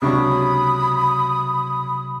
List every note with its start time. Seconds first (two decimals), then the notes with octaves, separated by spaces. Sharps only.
0.02 C#2 C3 F#3 D4 B5 C#6 D#6